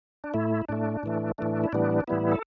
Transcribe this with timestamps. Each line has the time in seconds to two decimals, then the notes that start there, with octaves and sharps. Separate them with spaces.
0.24 D4
0.34 A2 A3 E4
0.69 A2 A3 D4
1.03 A2 E3 A3
1.38 A2 E3 A3 D4
1.64 E4
1.73 A2 E3 G3 B3 D4
2.08 A2 E3 G3 B3 E4
2.32 A4